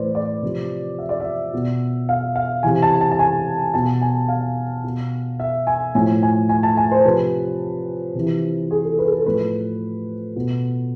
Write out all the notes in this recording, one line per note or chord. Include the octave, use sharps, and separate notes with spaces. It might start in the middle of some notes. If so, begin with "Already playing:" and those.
Already playing: A2 E3 B4 C5 D5
D5
C3 F3
E5
D5
E5
B2
F5
F5
C3 E3 G#5
A5
A5
A5
G#5
B2 A5
G#5
F5
B2
E5
G#5
A2 F3 G#5
G#5
G#5
A5
G#5
C5
C3 F3 B4
C3 E3
G#4
A4
B4
G#4
A4
A2 F3 B4
B2